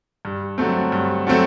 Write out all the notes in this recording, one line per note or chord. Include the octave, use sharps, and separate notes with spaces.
G2
D3 F#3 A3 C4
G2
D3 F#3 A3 C4